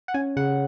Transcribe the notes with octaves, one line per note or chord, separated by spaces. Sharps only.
F#5
C#4 G#5
C#3 F#5